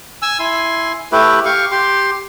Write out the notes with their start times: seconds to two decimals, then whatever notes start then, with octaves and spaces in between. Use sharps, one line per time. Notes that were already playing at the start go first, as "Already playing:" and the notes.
0.22 G#5 E6
0.39 E4 G#5 C6
1.12 A3 E4 G4 B4
1.45 G4 F5 C#6
1.71 G4 C6